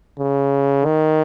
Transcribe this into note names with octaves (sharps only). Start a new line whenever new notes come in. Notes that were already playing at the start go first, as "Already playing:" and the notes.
C#3
D#3